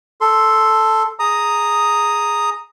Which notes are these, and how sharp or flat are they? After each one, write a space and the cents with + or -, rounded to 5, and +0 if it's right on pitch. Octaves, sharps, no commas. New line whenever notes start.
A4 +0 C6 +0
G#4 +0 A#5 -5 D#6 +0